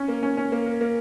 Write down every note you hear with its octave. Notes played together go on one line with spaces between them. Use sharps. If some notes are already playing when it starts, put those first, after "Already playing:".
Already playing: C#4
A#3
C#4
C#4
A#3
A#3
A#3